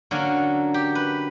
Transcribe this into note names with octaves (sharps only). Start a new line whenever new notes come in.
D3 F#3 A#3 C#4
G4
B4